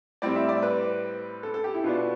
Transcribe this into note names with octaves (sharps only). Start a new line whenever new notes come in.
A2 G3 C4 D5
E5
D5
B4
A4
A4
G4
E4
B2 B3 D4 F4